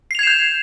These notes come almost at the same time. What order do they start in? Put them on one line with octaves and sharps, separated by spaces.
C7 F7 G#6 E7 G6